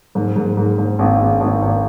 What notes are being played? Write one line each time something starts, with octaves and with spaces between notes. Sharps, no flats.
G#2
G#2
G#2
G#2
G#1
G#1
G#1
G#1